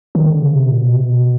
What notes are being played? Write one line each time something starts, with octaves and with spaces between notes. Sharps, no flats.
D#3
D3
C#3
C3
A#2
B2
C3
B2